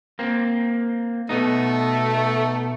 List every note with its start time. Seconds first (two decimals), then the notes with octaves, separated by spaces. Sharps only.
0.19 A#3 C4
1.29 B2 A3 B3 D#4